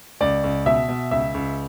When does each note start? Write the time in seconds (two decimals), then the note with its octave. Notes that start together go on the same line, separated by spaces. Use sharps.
0.21 C#2 D5
0.44 C#2
0.66 B2 E5
0.89 B2
1.11 C#2 E5
1.34 C#2